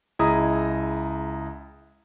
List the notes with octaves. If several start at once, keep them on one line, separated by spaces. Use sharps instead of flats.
C#2 E4 G#4 D#5 A#5 D#6